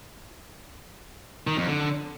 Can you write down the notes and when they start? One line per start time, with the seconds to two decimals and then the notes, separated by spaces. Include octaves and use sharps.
1.47 D#3
1.57 F2
1.67 D3